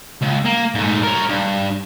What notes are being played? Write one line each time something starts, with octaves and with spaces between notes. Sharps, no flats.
C#2
A#3
G#2 A3
A#4 C#5
G2